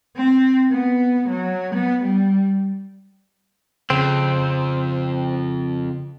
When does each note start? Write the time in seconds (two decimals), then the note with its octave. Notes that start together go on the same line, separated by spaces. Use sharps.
0.16 C4
0.71 B3
1.29 F#3
1.75 B3
2.03 G3
3.90 F2 C#3 C4